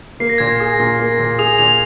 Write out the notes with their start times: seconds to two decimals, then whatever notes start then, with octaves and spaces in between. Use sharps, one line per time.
0.20 A#3 C7
0.30 A#6
0.38 A#2 G#6
0.47 A#6
0.60 G#4
0.80 A#2
0.99 A#3
1.19 A#2
1.38 G#4 F7
1.58 A#2 F7